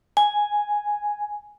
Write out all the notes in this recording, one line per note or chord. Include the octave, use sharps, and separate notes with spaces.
G#5